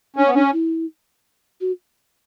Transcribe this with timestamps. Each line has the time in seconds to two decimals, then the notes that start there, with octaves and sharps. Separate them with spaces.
0.16 C#4 D4
0.27 B3
0.35 C#4 D4
0.53 E4
1.61 F#4